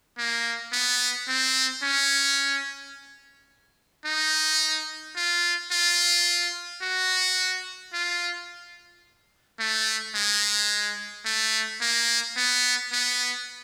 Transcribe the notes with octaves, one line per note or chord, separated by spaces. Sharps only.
A#3
B3
C4
C#4
D#4
F4
F4
F#4
F4
A3
G#3
A3
A#3
B3
B3